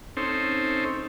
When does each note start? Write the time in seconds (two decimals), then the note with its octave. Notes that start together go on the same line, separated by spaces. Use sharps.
0.17 C4 C#4 D#4 A4 C5